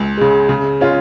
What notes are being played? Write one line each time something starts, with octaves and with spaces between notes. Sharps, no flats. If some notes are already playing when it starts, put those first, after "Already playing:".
Already playing: C#2
C#3 G#3
C#3
G#3 C#4 F4